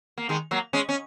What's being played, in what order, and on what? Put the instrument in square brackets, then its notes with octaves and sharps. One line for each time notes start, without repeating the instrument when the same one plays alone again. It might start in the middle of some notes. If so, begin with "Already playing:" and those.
[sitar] A#3
D#3 G#3
F#3 A#3
G#3 C#4
C#4